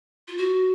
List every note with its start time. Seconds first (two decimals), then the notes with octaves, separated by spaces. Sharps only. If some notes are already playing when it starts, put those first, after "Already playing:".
0.28 F4
0.38 F#4